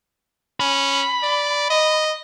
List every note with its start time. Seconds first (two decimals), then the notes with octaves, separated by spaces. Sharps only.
0.60 C#4 B5
1.23 D5
1.70 D#5